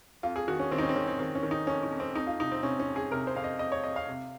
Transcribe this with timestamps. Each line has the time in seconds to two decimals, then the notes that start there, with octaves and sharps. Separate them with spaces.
0.23 F2 F4
0.36 G#4
0.48 D#3 F#4
0.60 C#4
0.71 D#3 C4
0.78 D#4
0.83 C#4
0.89 C4
0.96 D#3 C#4
1.07 C4
1.19 D#3 C4
1.35 C#4
1.43 D#3
1.51 D#4
1.67 F2 C#4
1.83 D#4
1.91 F2
2.00 C4
2.15 F2 D#4
2.27 F4
2.40 C3 D#4
2.52 C4
2.63 C3 C#4
2.79 C#4
2.88 F2
2.96 G#4
3.11 C3 A#4
3.27 C5
3.36 F2 F5
3.44 D#5
3.59 F2 D#5
3.72 C#5
3.83 F2 D#5
3.96 F5
4.08 C3